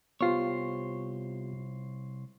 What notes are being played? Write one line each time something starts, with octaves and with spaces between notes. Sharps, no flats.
C2 B3 F4 G4 C5 C#5